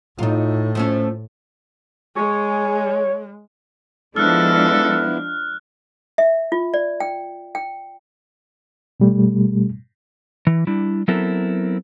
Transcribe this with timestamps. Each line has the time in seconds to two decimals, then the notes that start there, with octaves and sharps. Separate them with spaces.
0.19 A2 D#4 F4
0.75 F3 A3 C#4
2.16 G#3 G#4 C#5
4.16 F3 G#3 B3 D4 E4 A4 F6 F#6
6.18 E5
6.52 F4
6.74 D5
7.00 G5
7.55 G5
9.00 B2 G3 A3
10.47 E3
10.67 G3 D4 E4
11.08 F#3 B3 C4 E4 A4 A#4